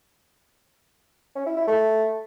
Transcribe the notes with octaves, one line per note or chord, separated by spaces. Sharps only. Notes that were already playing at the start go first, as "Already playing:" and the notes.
C#4
E4
E4
A3